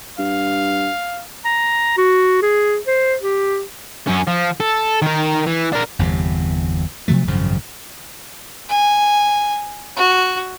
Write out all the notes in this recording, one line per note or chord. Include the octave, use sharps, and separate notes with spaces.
G2 F5
A#5
F#4
G#4
C5
G4
F#2 C#4
F3
A4
D#3 A#4
E3
D4 A#4
G1 E2 G2 C3
C3 F3 F#3 A3
G#1 F#2 C#3 F3
G#5
F#4